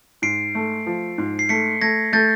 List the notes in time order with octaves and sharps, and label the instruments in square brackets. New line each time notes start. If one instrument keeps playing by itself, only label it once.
[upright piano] G#2 [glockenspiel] C7 D7
[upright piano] A3
F3
G#2
[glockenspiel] C7
[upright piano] A3 [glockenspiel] B6 C#7
[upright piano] A3 [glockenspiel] G#6 A#6
[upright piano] A3 [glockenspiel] G6 A6